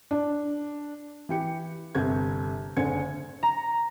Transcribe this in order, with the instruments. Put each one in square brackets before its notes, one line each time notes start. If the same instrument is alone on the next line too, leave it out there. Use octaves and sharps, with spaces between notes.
[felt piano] D4
E3 G4 C#7
G1 C3 G6 G#6
F#1 D3 C5 G#5 G#6 C#7
[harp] A#5